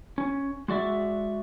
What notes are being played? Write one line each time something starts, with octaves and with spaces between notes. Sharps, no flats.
C#4
G#3 F#4 D5 E5